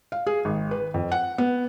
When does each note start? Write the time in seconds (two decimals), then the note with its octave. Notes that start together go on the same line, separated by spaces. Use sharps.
0.12 F5
0.27 G#4
0.45 G#1
0.71 B4
0.94 F2
1.12 F#5
1.38 B3